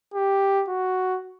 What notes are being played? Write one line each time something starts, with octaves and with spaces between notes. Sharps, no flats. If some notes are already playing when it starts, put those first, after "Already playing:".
G4
F#4